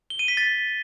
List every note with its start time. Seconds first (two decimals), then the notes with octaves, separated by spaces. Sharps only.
0.10 G7
0.19 D#7
0.28 B6
0.37 A6